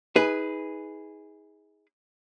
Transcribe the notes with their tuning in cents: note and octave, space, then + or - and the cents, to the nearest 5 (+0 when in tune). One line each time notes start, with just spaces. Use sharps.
D#4 +40 G#4 -5 B4 +0